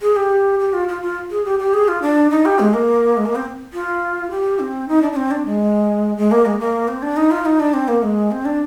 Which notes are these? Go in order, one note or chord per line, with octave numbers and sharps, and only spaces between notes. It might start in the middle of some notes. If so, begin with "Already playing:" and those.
G#4
G4
G4
F4
F4
F4
G#4
G4
G4
G#4
F4
D4
D#4
G4
G#3
A#3
G#3
A#3
C4
F4
G4
C4
D#4
D4
D4
C4
D4
G#3
G#3
A#3
G#3
A#3
C4
D4
D#4
F4
D#4
D4
C4
A#3
G#3
C4
D4